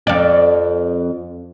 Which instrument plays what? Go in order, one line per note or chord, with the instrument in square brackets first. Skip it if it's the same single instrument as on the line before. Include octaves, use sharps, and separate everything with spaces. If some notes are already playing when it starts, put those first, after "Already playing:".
[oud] F2 D5